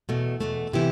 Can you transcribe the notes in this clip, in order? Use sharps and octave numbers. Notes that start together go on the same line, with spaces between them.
E2 B2 A3
E2 B2 A3
C3 E3 B3 E4 G4